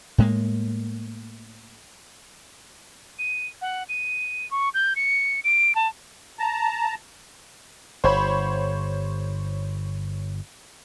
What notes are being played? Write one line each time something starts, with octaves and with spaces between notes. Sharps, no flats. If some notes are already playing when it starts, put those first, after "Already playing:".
A2 G#3 A#3
D#7
F#5
D#7
C#6
G6
C#7
D7
A5
A5 A#5
G1 C5 C#5 B5